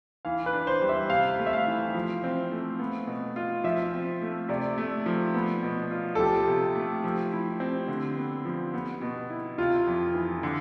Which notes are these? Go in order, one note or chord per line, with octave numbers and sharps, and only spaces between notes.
E3 F5
B4
D4
C5
G3
E5
C3 F5
A3
E5
F5
E3
F3
C4
A3
B3
B2
F4
F3 E5
C4
A3
C3 D5
A3
F3
B3
B2
F4
A4
F3 G4
C3
A3
F3
E4
C4
D3
B3
F3
B3
B2
E4
C3 F4
F2
E3
D3